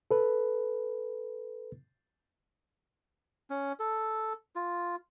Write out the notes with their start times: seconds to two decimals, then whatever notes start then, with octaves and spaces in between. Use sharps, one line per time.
0.11 A4 B4
3.50 C#4
3.80 A4
4.55 F4